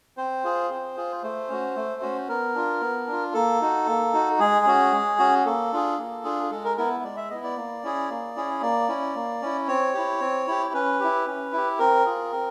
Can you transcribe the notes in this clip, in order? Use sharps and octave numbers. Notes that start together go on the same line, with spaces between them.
C4 C5
F4 G#4
C4
F4 G#4
A3 C5
C#4 F#4
A3
C#4 F#4
B3 A#4
D4 F4
B3
D4 F4
A#3 A4
D#4 F#4
A#3
D#4 F#4
G#3 G#4
C#4 F#4
G#3
C#4 F#4
A#3 A4
D4 F4 G#4
A#3
D4 F4 G#4
G#3 A4
A#4
B3 E4 A#4
G#3 D5
E5
B3 E4 D#5
D5
A#3
C#4 E4 G#4
A#3
C#4 E4 G#4
A#3 D5
C#4 E4
A#3
C#4 E4
C4 C#5
E4 G4
C4
E4 G4
C#4 B4
E4 G4
C#4
E4 G4
C4 A#4
F4 G#4
C4